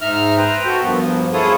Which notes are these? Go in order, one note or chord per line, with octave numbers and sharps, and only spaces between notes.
G#2 D#4 E5 A#5 F6
B4 C5 G5 A#5
F#4 A4
G2 F3 A#3 B3
E4 F4 G#4 A4 C#5 D#6